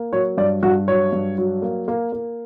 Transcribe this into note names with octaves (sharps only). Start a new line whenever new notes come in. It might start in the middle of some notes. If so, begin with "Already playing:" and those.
Already playing: A#3
F#3 C#5
G2 D5
G2 F#4
F#3 C#5
G2
F#3
A#3
A#3
A#3